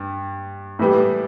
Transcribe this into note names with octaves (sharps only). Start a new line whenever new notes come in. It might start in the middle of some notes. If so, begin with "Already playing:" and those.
Already playing: G2
A2 E3 G3 B3